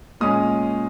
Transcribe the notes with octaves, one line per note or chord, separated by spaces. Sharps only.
A#2 G#3 C#4 D#6